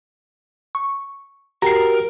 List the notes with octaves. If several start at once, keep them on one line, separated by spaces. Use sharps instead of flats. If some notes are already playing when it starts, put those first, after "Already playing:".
C#6
F#4 G4 A#4 A#5 C7